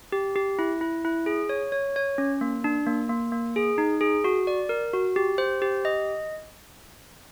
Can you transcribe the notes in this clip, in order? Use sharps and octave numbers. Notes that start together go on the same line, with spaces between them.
G4
G4
E4
E4
E4
G#4
C#5
C#5
C#5
C#4
A#3
D4
A#3
A#3
A#3
G#4
D#4
G#4
F#4
D5
A#4
F#4
G4
C5
G4
D#5